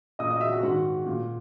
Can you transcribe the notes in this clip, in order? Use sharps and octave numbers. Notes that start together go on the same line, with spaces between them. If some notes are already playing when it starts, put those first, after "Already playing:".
A#2 D#5 D#6
D#5 D#6
E5 E6
F#4 F#5
G#2 D#3 F#4 F#5
A#2